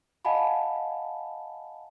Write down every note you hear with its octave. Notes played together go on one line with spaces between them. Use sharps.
D#5 F5 F#5 G#5 A5 B5